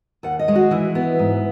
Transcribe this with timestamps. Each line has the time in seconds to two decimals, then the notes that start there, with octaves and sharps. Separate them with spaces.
0.23 D#2 F#5
0.39 D#5
0.48 G#3
0.55 F#4
0.71 E3 E4
0.95 B3
1.19 G#2